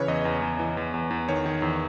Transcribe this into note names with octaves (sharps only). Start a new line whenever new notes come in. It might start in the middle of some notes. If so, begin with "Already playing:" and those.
Already playing: C#3 E3 B4 C#5
E2 D#5
E2
E2
E3
E2
E2
E2
D#3 C#5
D#3
E2